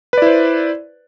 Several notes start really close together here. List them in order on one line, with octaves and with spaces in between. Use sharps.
B4 D5 E4 C5